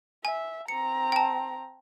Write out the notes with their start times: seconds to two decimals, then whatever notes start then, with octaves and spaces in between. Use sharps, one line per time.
0.25 E5 G#5
0.68 C4 A#5 C#7
1.12 G5 A5